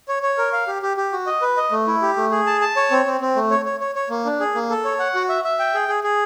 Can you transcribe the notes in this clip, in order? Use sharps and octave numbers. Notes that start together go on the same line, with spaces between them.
C#5
C#5
A#4
F5
G4
G4
G4
F#4
D#5
B4
D#5
A3
E4
G4
A3
G#4
A5
A5
C#5
C4
C4
C4
A3
C#5
C#5
C#5
C#5
A#3
D4
G#4
A#3
A4
C#5
F#5
F#4
E5
E5
G5
G#4
G#4
G#4